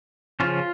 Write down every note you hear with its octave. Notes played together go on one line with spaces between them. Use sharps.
C#3 F3 C#4 F4